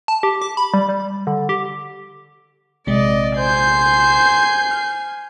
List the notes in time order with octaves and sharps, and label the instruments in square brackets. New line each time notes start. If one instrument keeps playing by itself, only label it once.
[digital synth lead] A5
G4
D6
B5
G3
G3
D3
G4
[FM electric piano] A#1 C3 G#3 [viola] D5 D#5
[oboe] C5 [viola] G#5 [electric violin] G6 C7
[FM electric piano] F6